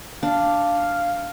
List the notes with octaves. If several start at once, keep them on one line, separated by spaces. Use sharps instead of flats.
D4 F5